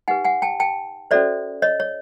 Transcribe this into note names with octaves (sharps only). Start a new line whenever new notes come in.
D#4 G4 B4 F#5 G#5
F#5 G#5
G5 A5
G5 A5
C#4 F#4 A4 C5 D5 E5
C#5 D#5
C#5